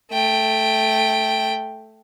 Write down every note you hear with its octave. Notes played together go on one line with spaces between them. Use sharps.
A3 G5